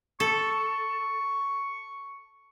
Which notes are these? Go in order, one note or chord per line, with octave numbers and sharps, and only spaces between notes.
A4 C#6